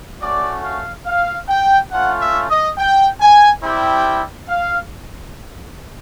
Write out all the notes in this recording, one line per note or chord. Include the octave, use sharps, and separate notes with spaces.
A3 C#4 F#4 D5
F5
F5
G5
A3 C#4 F4 F#5
E5
D#5
G5
G#5
G3 C4 E4 G4 G5
F5